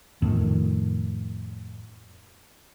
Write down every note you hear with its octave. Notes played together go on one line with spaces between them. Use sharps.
F2 A2 D#3